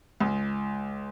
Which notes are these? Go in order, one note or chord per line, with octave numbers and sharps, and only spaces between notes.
C#2